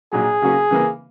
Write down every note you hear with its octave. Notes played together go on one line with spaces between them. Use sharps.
A#1 A#2 F#3 G#4
C#3 F#3 A#3 C#4 F#4
C#3 E3 A#3